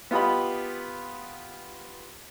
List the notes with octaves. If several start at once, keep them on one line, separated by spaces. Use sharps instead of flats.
B3 F4 G4 D#5 B5